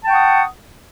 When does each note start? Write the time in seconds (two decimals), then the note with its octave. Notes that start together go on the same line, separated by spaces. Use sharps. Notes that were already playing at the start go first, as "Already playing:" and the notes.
0.04 A5
0.07 G5
0.09 C#6
0.12 F#5
0.15 D#6